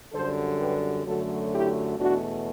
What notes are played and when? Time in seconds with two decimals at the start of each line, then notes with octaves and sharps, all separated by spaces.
0.12 F#2 D3 G3 A4 C5
0.60 G4 B4
1.05 F#2 D3 F#3 A3 F#4 A4
1.53 E4 G4
1.99 E2 B2 A3 D4 F#4